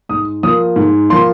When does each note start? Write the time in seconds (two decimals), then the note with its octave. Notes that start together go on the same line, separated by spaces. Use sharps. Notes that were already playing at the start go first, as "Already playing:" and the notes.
0.09 G#2 D#6
0.43 F3 A#3 D#6
0.76 G#2
1.09 F3 A#3 C6